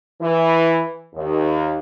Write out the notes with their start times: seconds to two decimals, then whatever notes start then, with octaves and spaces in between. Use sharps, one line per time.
0.20 E3
1.14 D#2